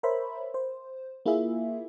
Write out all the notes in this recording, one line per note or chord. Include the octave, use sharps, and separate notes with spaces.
A#4 C5 C#5 E5 B5
C5
A#3 E4 F4 G#4 E5